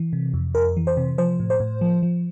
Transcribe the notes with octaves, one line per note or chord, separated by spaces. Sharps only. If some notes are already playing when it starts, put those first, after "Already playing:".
Already playing: E3
C3
F2
F2 A#4
E3
C5
C3
F3 C5
A2
C5
A2
F3
F3